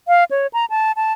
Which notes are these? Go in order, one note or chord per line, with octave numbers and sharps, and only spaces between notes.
F5
C#5
A#5
A5
A5